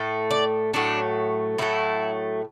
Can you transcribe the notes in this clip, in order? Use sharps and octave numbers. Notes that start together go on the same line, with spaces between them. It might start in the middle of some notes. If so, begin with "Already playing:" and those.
Already playing: A2 A3
D5
A2 F#3 A3 D4
A2 F#3 A3 E4